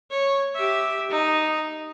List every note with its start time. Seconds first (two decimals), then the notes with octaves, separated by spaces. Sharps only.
0.11 C#5
0.55 G4 E5
1.10 D#4